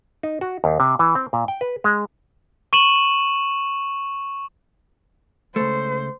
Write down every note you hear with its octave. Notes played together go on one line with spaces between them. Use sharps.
D#4
F#4
D#2
C3
E3
C4
A#2
G5
B4
G#3
C#6 D#7 E7 F#7
C#2 A3 C5